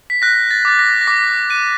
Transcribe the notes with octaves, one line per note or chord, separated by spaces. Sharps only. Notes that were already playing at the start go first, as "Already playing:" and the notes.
B6
F#6 A#6
A6
D6 A6
A#6
A#6
D6 B6
F#6 D#7